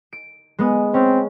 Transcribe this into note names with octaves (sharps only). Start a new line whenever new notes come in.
D7
G#3 B3 D#6
C4 C#4